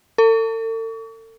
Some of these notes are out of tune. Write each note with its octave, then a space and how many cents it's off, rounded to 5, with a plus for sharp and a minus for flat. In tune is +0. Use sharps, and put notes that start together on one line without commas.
A4 +40 C#6 +40